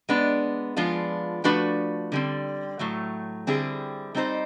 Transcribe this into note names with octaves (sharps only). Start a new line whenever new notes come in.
G#3 B3 D4
F3 G#3 B3 D4 F4
F3 A3 D4 F#4 B4
D3 G3 C4
A2 F#3 A3
D3 G3 C4 E4 G#4
G3 C4 D#4 G4 C5